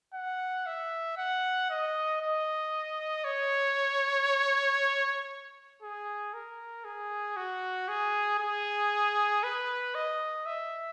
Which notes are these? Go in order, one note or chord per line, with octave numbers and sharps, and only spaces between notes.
F#5
E5
F#5
D#5
D#5
C#5
G#4
A#4
G#4
F#4
G#4
G#4
B4
D#5
E5